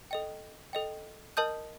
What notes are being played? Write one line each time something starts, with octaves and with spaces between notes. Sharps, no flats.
A4 D#5 G5
A4 D#5 G5
A#4 D#5 A5 D#6 G6